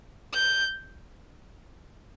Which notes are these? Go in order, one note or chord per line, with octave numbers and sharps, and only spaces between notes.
G6